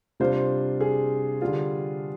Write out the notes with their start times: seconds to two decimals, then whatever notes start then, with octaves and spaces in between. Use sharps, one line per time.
0.20 C3 G3 D4 F4 C5
0.81 G#4
1.42 D3 G3 D4 F4